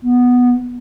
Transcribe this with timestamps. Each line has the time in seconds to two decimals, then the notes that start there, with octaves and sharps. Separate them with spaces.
0.02 B3